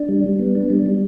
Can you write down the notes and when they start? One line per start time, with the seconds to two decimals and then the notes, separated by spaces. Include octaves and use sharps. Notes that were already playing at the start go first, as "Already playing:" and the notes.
Already playing: D4
0.09 G3
0.24 G3
0.39 B3
0.55 D4
0.70 G3
0.86 G3